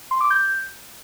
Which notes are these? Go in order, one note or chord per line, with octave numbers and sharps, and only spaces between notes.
C6
D6
G6